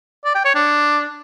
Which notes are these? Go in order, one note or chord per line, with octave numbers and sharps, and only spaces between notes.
D5
G5
C#5
D4